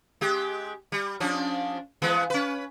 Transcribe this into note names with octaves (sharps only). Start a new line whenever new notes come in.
G#3 G4
G3
F3 C#4 D4
E3 G#3 B3
C#4 B4